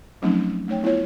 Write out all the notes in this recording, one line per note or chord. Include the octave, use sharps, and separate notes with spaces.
F3 F#3 A3 C4 C#4 D#4
A3 D#4 C#5 G5
B3 E4 F4 C#5